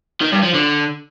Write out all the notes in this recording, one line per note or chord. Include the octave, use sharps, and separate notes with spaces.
D#3
G2
F3
D3